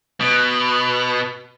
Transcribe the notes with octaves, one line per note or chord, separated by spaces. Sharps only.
B2